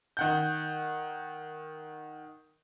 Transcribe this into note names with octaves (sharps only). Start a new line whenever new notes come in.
D#3 F#5 G6